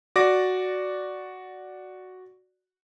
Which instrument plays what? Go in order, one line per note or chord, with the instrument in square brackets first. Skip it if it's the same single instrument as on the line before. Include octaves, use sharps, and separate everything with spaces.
[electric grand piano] F#4 D5 D6 A#6